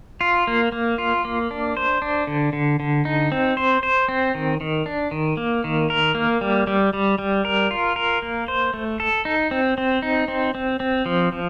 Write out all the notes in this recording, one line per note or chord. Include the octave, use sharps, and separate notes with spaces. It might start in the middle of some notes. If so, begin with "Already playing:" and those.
F4
A#3
A#3
F4
A#3
D4
C5
D4
D3
D3
D3
D#4
C4
C5
C5
C4
D#3
D#3
D4
D#3
A#3
D#3
A#4
A#3
G3
G3
G3
G3
A#4
F4
A#4
A#3
C5
A3
A4
D#4
C4
C4
D#4
C4
C4
C4
F3
F3